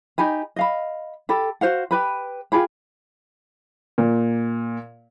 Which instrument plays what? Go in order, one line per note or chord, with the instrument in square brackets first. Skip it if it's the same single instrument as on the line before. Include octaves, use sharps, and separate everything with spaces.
[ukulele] D#4 G4 G#5 B5
D#5 F5 B5
G4 A4 B5
F#4 C5 F5 F#5
G4 B4 B5
F4 G4 G#4 B5
[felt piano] A#2